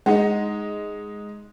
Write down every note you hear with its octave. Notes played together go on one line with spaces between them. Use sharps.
G#3 D#4 D#5 F#5